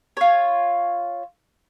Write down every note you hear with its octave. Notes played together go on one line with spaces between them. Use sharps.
F4 C#5